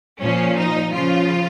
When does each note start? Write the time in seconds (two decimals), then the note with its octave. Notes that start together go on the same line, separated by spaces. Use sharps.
0.20 A#2 F3 C#4
0.56 D#4
0.93 C#3 F3 F4